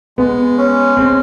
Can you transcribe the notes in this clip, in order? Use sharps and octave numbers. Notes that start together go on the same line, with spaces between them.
G#3 B3
C#4
G#3 C4